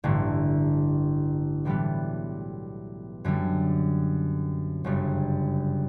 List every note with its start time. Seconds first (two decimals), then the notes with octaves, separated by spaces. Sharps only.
0.04 A1 G2 D3
1.65 B1 A2 E3 G3 B3
3.25 F#2 D3 G3
4.84 G1 F#2 C#3 G3